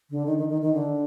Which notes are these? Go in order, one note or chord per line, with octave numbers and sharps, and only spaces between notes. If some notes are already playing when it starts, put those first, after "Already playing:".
D3
D#3
D#3
D#3
D#3
D3